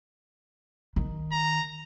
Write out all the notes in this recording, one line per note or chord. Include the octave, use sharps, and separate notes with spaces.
D#3
A#5